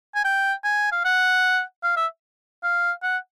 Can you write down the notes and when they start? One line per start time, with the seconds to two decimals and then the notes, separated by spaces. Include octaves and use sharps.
0.15 G#5
0.25 G5
0.64 G#5
0.92 F5
1.05 F#5
1.84 F5
1.97 E5
2.63 F5
3.03 F#5